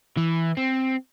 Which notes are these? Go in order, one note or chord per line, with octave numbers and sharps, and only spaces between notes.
E3
C4